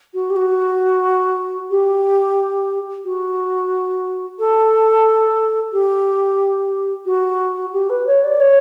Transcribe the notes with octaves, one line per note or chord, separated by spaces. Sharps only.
F#4
G4
F#4
G4
F#4
A4
G4
F#4
G4
B4
C#5
D5
C#5